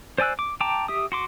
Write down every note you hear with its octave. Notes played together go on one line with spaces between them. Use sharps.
C5 D5 G#5 E6 F#6
D6
G5 A5 A#5 D6
G4 E5 D#6
F#4 C6 D6